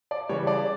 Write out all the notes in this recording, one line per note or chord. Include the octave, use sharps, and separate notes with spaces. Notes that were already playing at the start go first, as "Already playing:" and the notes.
D5
C#3 E3 G3 C#5
D5